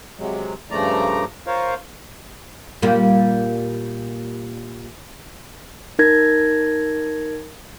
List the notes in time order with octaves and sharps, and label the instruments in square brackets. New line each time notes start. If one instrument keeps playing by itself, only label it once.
[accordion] C3 F#3 G#3
G2 C#3 F3 A3 D5 A#5
F4 A#4 C5 C#5 F5
[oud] A#2 G3 A#3
[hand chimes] D#4 A#4 G#6 A#6